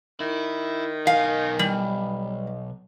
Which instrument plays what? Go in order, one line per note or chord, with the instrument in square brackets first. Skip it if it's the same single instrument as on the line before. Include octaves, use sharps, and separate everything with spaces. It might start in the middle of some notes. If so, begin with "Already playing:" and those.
[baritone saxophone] D#3 [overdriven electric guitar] E4
[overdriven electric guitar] B1 G#5 [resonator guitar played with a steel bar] F5
[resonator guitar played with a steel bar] G3